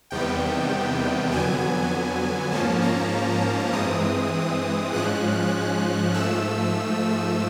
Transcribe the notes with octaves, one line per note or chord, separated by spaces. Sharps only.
E2 C3 D#3 G3 B3 G5
F2 D3 F#3 B3 G#5
G#2 F3 A#3 C#4 A5
A#5
G2 E3 G#3 C4 D#6
G#2 F3 G#3 C#4 F#6
G#2 F3 A3 E6